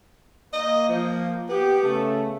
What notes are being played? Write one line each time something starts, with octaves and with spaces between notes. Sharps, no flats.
A#3 D#5
F3
B3 G4
C#3 A3